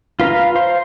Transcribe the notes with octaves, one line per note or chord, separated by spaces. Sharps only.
F4 B4 F5 A#5
C5 F5 C6